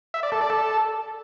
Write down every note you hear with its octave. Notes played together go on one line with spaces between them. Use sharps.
E5
D5
A4
D5
A4